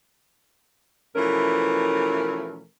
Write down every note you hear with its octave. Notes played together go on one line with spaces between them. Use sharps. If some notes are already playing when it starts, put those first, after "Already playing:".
B2 E3 F3 A3 C#4 A#4